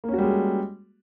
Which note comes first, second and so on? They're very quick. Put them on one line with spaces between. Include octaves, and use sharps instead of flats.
A#3 C#4 F#4 G3 G#3